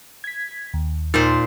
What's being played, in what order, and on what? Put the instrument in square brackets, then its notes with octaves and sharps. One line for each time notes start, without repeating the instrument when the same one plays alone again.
[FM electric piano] G#6 B6
D#2
[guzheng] A#2 C5 [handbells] D#4